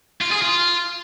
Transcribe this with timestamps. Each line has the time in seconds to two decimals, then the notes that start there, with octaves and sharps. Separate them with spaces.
0.21 F4
0.31 G#4
0.42 F4